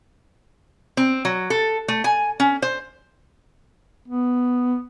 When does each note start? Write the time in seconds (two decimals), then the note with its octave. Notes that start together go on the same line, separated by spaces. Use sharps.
0.97 C4
1.25 F#3
1.50 A4
1.88 A3
2.04 G#5
2.40 C#4
2.62 C5
4.08 B3